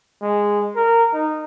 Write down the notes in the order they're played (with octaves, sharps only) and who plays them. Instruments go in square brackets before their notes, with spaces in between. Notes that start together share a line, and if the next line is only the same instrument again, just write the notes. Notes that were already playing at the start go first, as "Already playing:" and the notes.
[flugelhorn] G#3
A#4
D#4